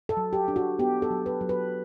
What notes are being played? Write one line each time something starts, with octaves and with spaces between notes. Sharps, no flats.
A4
F#3
G4
D4
F#4
B3 G4
A4
F#3
B4
F#3
B4